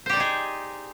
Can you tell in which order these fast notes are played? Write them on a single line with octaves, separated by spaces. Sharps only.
C5 G4 D5 D#4 G#4